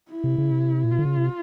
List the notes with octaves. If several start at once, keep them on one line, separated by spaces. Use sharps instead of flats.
E4
C3
C#3
C3
A#2
B2 F4
D3
C#3
C3